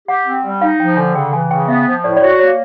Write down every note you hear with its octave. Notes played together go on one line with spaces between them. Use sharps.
G4 F#5
C4
G3
D#4 F5
F3 G5
D3 G#5
C#3 G5
E3 G#5
C#3 G5
B3 E5
F3
A2 D5
D5
F#4 C#5
A#3 C#5